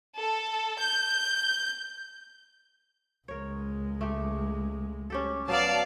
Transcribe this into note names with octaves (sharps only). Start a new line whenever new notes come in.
A4
G6
C#2 G#3 A#4 C#5
A3 G4
C#4 G4 A4
F#3 B3 D5 F5 A5